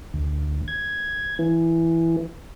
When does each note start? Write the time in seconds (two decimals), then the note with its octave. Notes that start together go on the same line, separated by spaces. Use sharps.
0.14 D2
0.68 G#6
1.39 E3